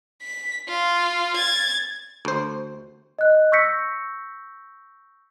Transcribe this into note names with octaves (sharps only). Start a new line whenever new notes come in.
B6
F4
G#6 A6
D2 C5
D#5 F#6
C#6 E6 G6 A#6 B6 C#7